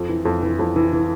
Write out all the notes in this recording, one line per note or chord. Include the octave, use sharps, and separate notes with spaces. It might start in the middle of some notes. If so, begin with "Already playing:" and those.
Already playing: F2
E3
F2
E3
F2
E3
E3